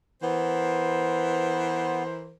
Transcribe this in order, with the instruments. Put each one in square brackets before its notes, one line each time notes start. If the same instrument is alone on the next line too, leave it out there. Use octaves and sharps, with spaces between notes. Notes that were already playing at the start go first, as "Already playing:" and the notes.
[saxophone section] E3 A#4 C5 [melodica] B3